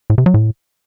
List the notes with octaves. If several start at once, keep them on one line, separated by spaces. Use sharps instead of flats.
A2
C3
F#3
A2